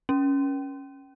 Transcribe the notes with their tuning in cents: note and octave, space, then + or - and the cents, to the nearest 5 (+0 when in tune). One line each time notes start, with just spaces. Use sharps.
C#4 +0